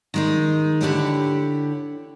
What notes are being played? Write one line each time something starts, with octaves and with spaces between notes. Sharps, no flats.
D#3 G#3 D#4
D3 E4 G4 C#5